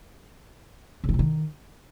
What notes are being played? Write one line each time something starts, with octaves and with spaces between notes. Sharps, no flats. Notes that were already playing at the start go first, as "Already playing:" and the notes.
C#3
E3
C3
D#3